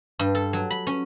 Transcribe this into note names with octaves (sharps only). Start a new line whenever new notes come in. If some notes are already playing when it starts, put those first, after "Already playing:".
G2
A4
F#3
B5
C#4